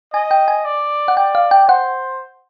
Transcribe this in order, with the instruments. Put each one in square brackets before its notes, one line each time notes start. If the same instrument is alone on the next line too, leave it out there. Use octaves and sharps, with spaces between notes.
[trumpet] D#5 [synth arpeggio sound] G#5
[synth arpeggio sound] G5
G#5
[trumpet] D5
[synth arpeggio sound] F#5
[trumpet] D5 [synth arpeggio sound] G5
[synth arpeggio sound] F5
G5
[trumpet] C5 [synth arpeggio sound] F#5